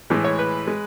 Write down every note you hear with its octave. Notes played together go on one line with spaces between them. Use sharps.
A2 E3 G#3
C#5
B4
G#3